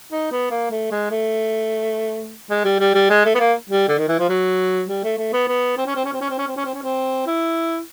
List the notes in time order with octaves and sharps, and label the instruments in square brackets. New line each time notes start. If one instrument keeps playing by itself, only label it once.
[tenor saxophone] D#4
B3
A#3
A3
G#3
A3
G#3
G3
G3
G3
G#3
A3
B3
A#3
G3
D3
D#3
E3
F3
F#3
G3
A3
A3
B3
B3
C4
C#4
C4
C#4
C4
C#4
C4
C#4
C4
C#4
C4
C#4
C4
E4